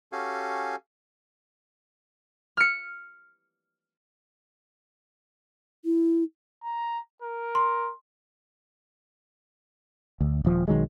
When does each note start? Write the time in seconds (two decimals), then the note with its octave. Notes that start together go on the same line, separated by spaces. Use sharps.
0.12 C#4 F#4 G4 A4 F5 G#5
2.57 F6 C#7
5.85 E4
6.63 A#5
7.22 A#4
7.55 C6
10.21 D2
10.45 D#1 F3
10.68 B1 D#3 F#3 G#3